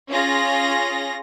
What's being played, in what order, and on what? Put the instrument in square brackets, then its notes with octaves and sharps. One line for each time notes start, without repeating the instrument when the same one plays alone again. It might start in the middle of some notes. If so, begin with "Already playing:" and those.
[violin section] C#4 F4 G#4 A#6